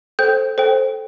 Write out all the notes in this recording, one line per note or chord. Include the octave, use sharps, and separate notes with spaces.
A4 C5 G5 G6
A4 C5 G5